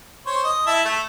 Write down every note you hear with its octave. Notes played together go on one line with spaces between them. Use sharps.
C5 C#5
D#5
E4 E5 A5
A3